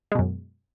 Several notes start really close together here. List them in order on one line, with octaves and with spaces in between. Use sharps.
G#3 B2 F#2